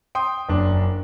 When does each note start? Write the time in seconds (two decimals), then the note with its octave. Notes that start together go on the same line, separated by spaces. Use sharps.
0.15 G5 C6 D#6
0.49 F#1 D4